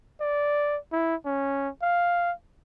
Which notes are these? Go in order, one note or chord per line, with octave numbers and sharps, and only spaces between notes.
D5
E4
C#4
F5